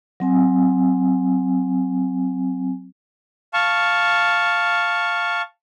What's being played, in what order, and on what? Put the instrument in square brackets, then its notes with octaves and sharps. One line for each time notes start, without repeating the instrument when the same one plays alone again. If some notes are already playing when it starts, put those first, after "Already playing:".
[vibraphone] F#3 C4 G#5
[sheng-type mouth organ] F5 A5 C#6